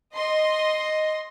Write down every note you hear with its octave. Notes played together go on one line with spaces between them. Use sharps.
D#5 C6